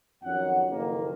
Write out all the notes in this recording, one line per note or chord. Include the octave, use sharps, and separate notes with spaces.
F2 D#3 F#3 C#4 F#5
F#1 F2 D#3 A#3